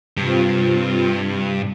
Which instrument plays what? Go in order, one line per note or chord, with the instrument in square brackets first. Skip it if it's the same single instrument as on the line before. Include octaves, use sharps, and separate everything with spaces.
[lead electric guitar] G2 [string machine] C3 C4 F4